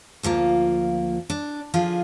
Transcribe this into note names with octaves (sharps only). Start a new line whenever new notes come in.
D2 F3 A#3 F4
D4
D3 F3 F4 G#4